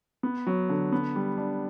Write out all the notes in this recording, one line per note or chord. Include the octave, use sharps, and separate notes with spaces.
B3
F#3
D3
B3
G3
D4